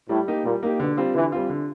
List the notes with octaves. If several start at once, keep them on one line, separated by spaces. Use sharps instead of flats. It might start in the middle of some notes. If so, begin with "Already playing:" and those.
A2 G3
A#3 D#4 G4
A#2 G3
A#3 D#4 G4
B2 D3
G3 C4 F4
D3 E3
G3 C4 F4
D3